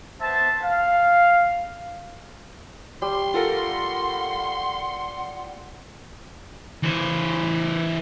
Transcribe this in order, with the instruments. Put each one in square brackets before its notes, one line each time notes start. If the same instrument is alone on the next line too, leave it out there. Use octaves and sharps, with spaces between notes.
[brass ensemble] B3 C5 E5 A5
F5
[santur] G3 [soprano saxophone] C6
[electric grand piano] F4 A4 A#4 [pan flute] F#5
[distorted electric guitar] E3 C5